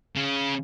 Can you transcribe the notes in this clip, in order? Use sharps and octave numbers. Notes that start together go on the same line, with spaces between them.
C#3